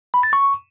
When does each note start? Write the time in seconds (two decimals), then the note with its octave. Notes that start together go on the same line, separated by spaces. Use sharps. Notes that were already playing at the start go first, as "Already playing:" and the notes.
0.14 B5
0.23 A6
0.33 C#6